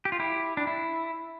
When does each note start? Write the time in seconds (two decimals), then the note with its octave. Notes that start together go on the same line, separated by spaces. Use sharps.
0.05 G4
0.12 F4
0.20 E4 G4
0.57 D4
0.67 E4